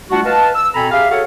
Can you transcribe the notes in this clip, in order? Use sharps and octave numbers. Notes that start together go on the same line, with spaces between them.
G3 A3 D4 F4 F#4
B4 D#5 F5 A5
E6
B2 C4 A4 G#5 A#5 B5
G4 G#4 E5 F5
F#4 G#4 A4 C#5 F5 F#5